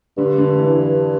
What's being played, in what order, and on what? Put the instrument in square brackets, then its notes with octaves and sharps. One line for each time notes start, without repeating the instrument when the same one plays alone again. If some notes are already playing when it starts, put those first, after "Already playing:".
[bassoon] G2 [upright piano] D3
[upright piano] D3
E3